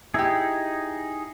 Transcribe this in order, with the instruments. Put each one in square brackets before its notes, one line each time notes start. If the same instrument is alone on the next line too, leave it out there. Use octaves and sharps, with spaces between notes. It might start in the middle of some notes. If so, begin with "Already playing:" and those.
[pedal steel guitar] D#4 G#4 [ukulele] E4 G4